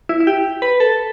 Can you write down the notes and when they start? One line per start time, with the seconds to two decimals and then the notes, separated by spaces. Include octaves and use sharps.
0.09 E4
0.20 E4
0.27 G4
0.62 B4
0.80 A4